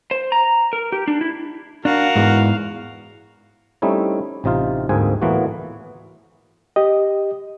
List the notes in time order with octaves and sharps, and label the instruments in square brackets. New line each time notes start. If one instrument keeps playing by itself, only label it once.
[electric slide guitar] C5
A#5
A#4
G4
D4
E4
[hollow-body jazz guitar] D4 [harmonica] F#4 A#4 [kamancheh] F5
[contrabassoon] E2 [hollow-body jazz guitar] G#2
[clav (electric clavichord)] G3 A3 C4 C#4 D#4 E4
A1 C3 D#4 F4 F5
D2 G#2 A#3 C4 G#4 G#5
A2 E3 A#3 B3 F4 F#4
[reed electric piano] G4 D#5